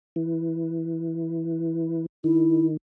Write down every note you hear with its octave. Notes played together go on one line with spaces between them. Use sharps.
E3
D#3 E4